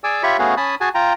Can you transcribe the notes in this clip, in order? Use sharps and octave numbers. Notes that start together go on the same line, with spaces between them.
G#4 D5 G#5 D6 E6
F4 G4 C#5 E5 B5 C#6
A3 B3 C#4 F#4 G#4 F5
C#4 G#5 A5 B5 D#6
F#4 G#4 G#5 A5
F4 G5 A#5